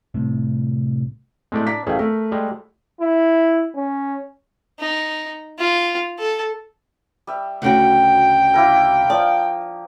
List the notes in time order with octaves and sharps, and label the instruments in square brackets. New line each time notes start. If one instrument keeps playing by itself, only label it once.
[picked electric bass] C2 A2 C3
[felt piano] A2 [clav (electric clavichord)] G#3 A3 D5
[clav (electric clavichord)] D4 [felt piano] A#5 D6 B6
[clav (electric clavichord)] A1 G3 A3 [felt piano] G#4 F5
[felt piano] A3 [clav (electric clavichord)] A#4
[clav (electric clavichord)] G3 G#3
[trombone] E4
C#4
[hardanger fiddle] D#4
F4
A4
[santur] G3 E5
[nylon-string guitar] D2 C#3 F#4 [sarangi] G5
[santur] A#3 E4 A#4
[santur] F3 [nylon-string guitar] D5